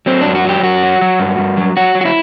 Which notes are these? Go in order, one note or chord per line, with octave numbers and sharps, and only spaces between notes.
F#3 C4
F#2 D4
F#4
F#3 G4
F#2 F#4
F#3
F#3
G2
G2
F#3
F#3 F#4
F#3
F#4
E4